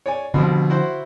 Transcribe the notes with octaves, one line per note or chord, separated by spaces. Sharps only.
C#5 D5 G#5
C2 B2 D3 F3
E4 F#4 C5